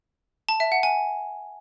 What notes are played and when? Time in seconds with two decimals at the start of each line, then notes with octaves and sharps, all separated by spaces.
0.49 A5
0.60 E5
0.72 F#5
0.83 G#5